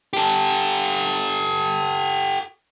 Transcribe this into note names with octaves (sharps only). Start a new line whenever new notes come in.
G4 A4